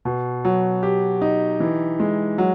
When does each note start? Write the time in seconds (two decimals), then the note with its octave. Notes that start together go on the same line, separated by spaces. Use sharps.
0.05 B2
0.45 F#3
0.83 G4
1.22 D#4
1.60 E3
2.00 G#3
2.38 F#3